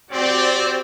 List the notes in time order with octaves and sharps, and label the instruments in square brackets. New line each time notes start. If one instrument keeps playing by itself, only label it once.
[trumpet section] C4 [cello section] F#4 G4 C5 [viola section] D5